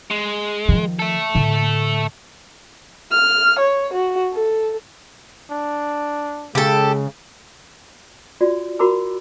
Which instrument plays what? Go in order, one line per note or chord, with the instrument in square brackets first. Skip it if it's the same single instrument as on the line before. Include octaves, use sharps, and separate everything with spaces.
[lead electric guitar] G#3
[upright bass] D#3 F3
[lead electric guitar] A4 E5
[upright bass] A2 D3
[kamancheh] F6
C#5
F#4
A4
[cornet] D4
[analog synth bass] C#3 [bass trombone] G#3 [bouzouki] G4 A4
[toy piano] F4 F#4 D5
F#4 A#4 A#5 B5 D6 E6